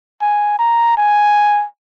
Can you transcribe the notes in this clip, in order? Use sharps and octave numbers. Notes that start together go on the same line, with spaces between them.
G#5
A#5
G#5